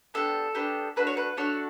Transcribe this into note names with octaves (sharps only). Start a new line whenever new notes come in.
B3 D4 G4 A4
B3 D4 G4
A3 D4 F#4 B4
C#5
B4
A3 D4 F#4 C#5